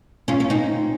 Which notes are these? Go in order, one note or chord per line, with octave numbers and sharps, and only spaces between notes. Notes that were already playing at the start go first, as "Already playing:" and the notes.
C#4 F4
C#4
C4 D#4